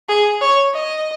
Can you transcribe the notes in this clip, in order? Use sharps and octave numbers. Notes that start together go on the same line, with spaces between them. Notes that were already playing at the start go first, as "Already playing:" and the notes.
G#4
C#5
D#5